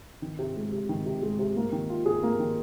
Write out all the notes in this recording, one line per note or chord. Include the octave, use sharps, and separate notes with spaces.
D#3
C3
G#3
C3
D#3
C3
G#3
C3
A#3
D#3
F4
G#4
A#3
D#3